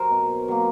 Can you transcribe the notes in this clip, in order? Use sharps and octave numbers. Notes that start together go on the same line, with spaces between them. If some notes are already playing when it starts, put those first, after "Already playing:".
Already playing: F#3 A#4 C5
B2
F#3 A#3